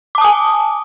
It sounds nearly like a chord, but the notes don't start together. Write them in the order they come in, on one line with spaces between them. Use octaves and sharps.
D6 A5 D#6 G#5